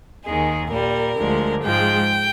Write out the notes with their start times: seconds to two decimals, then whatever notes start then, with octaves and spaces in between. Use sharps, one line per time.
0.25 D#2 D#3 G#3 G#4
0.71 A#2 G3 A#4
1.17 D2 D3 F3 G#3
1.62 G#2 F3 G#3 G5